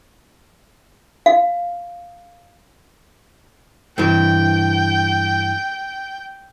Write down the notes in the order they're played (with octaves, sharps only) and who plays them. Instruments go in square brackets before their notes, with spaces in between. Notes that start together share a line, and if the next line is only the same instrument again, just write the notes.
[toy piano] F5
[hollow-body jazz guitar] G2 E3 [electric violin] G5